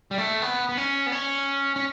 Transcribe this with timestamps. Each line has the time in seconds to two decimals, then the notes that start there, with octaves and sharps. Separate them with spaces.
0.11 G3
0.18 A3
0.42 B3
0.69 B3
0.77 C#4
1.06 B3
1.12 C#4
1.76 C#4